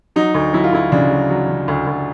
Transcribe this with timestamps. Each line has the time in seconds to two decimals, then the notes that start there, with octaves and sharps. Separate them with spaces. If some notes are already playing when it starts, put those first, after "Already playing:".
0.16 F#3 D#4
0.34 D2
0.53 F#3 E4
0.64 F4
0.73 D2 E4
0.92 C#3 D4
1.11 F#3
1.30 F#3
1.49 C#3
1.68 D2
1.87 D2